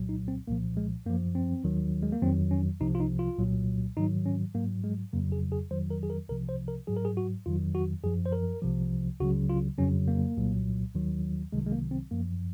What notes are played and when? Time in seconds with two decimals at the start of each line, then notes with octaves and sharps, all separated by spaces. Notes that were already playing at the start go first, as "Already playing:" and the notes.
Already playing: C2 A#2 F#3
0.09 D#4
0.28 C4
0.47 C2 A#2 F3 A#3
0.77 G#3
1.06 F#2 F3 A#3
1.35 C4
1.64 D#2 D#3 F#3
2.02 G#3
2.12 A#3
2.22 F2 D#3 F#3 C4
2.51 C#4
2.80 C2 C3 F3 D#4
2.95 F4
3.00 D#4
3.19 F4
3.38 C2 A#2 F#3
3.97 G#2 D#3 F#3 D#4
4.26 C#4
4.54 G#2 F#3 A#3
4.84 G#3
5.13 F2 C#3 F#3 A#3
5.32 G#4
5.52 G#4
5.71 F2 D#3 F#3 C5
5.90 A#4
6.03 G#4
6.10 A#4
6.29 C2 C3 F3 A#4
6.49 C5
6.68 A#4
6.87 G#2 F#3 G#4
6.97 A#4
7.05 G#4
7.17 F#4
7.46 F2 D#3 F#3 F4
7.75 F#4
8.03 F#2 F3 G#4
8.25 C5
8.33 A#4
8.62 C2 C3 F3
9.20 C#2 C#3 F#3 F#4
9.50 F4
9.78 F2 C#3 F#3 C#4
10.08 A#3
10.37 C2 A#2 F#3
10.95 D#2 D#3 F#3
11.52 C2 C3 D#3 F#3 G#3
11.67 G#3
11.72 A#3
11.91 C4
12.11 F#2 F3 A#3